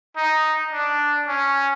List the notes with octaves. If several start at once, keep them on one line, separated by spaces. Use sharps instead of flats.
D#4
D4
C#4